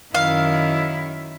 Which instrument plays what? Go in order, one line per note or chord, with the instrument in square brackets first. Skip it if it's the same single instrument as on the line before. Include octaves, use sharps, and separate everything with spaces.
[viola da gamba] F#2 D#3 E4 [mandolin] F5